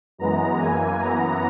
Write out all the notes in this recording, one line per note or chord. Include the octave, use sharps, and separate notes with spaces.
F#2 E3 G#3 B3 A#5
F#2 E3 A#3 G#5
F#2 E3 B3 A#5